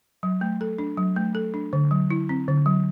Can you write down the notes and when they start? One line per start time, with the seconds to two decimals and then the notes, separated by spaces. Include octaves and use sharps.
0.23 F#3
0.41 A3
0.61 A4
0.79 D4
0.97 F#3
1.16 A3
1.35 A4
1.54 D4
1.73 D3
1.91 F#3
2.10 E4
2.29 C4
2.48 D3
2.66 F#3